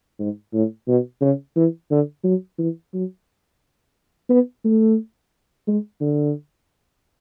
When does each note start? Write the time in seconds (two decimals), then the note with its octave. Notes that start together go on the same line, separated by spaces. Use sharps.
0.19 G#2
0.53 A2
0.88 B2
1.21 C#3
1.56 E3
1.91 D3
2.24 F#3
2.58 E3
2.94 F#3
4.30 B3
4.65 A3
5.67 G#3
6.01 D3